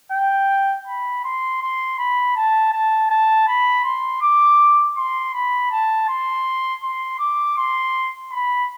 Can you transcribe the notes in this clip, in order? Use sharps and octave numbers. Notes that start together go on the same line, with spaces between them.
G5
B5
C6
C6
B5
A5
A5
A5
B5
C6
D6
C6
B5
A5
C6
C6
D6
C6
B5